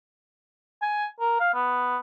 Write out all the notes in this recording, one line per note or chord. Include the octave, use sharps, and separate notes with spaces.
G#5
A#4
F5
B3